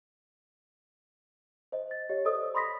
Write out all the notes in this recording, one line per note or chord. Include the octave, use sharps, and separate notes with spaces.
C5 D#5
A6
G4 C#5 D#5
A4 C5 D5 D#5 D#6 E6
B5 C6 D#6 A#6 B6